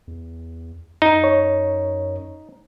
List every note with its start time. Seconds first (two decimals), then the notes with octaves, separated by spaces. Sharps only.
0.07 E2
1.02 F#2 D#4
1.24 C#5